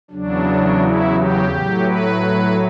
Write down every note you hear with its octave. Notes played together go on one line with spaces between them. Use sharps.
E2 C#3 F#3 D4
E4
G4
A2 F#3
B4